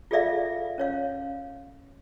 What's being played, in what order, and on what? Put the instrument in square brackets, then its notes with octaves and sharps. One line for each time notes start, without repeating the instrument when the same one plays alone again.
[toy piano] F4 G#4 A4 D5 E5 F5
C#4 C#5 F5